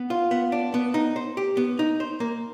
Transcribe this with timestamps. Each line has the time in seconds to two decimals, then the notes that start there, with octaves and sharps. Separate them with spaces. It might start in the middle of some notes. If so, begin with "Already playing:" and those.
Already playing: B3
0.10 F4
0.31 B3
0.52 D4
0.74 B3
0.94 D#4
1.16 C5
1.37 G4
1.57 B3
1.79 D#4
2.00 C5
2.20 A#3